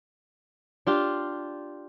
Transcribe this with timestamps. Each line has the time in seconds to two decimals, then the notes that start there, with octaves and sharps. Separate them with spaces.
0.87 D4 F4 G4